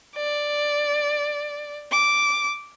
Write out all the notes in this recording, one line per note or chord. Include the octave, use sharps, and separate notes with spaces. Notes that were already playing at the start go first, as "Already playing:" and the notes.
D5
D6